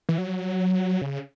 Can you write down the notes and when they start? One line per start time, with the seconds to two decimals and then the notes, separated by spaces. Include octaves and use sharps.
0.09 E3
0.18 F#3
1.02 C#3